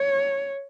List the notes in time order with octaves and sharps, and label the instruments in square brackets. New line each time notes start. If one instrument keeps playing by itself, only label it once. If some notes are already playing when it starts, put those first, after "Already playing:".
Already playing: [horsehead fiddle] C#5